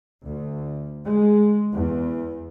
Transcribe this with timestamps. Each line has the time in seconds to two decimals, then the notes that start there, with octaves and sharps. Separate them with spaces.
0.25 D2
1.05 G#3
1.75 E2